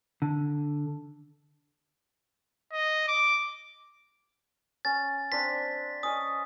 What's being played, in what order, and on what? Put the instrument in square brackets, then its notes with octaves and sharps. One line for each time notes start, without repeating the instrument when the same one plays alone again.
[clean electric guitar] D3
[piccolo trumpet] D#5
D6
[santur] C#4 [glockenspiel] A6
[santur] C4 D4 F5 [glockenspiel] B6
[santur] C#4 C#5 D#5 [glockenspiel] D#6